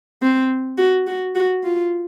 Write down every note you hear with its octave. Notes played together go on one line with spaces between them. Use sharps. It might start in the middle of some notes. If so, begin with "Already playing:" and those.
C4
F#4
F#4
F#4
F4